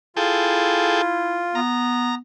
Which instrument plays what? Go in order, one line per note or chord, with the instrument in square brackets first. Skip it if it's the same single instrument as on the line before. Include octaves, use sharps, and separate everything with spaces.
[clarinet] E4 [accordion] F4 [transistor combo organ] G#4 A4 G5
[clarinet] B3 [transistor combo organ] A#5